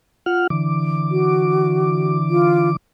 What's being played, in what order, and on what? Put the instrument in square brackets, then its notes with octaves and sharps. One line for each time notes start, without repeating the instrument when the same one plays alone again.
[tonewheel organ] F4 F#5 F6
D3 E3 D6
[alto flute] F#4
F4